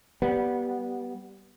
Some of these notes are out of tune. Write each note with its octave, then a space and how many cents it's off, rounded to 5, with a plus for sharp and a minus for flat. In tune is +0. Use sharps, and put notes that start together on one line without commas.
G3 -15 B3 -15